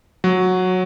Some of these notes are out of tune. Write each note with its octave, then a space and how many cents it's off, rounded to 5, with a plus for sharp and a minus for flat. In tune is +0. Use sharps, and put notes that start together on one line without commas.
F#3 -10